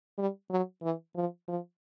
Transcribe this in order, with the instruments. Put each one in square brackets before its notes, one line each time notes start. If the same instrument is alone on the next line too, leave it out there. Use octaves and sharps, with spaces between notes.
[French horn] G3
F#3
E3
F3
F3